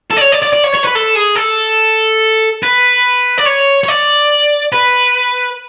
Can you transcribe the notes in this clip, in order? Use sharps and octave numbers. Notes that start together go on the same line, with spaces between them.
A4
D5
C#5
D5
D5
D5
C#5
C#5
B4
A4
G#4
A4
B4
D5
C#5
C#5
D5
B4